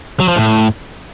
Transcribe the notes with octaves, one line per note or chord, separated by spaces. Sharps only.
F#3
F3
A2